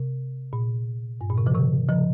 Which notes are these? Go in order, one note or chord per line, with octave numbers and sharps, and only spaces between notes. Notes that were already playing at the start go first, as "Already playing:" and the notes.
Already playing: C3
A#2
G2
A#2
C3
C#3 F3
C3 D#3
C#3 F3